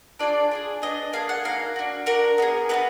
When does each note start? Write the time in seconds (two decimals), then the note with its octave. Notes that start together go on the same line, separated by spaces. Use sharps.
0.19 D4 F4 G#4 D5
0.51 D4 F4 G#4
0.82 B3 D4 G#4 D#5
1.13 A#3 D4 G#4 F5
1.29 F#5
1.44 A#3 D#4 F#4 F5
1.76 D4 F#4
2.06 D4 F#4 A#4
2.38 B3 D#4
2.42 G#4
2.69 B3 D#4 F#4 B4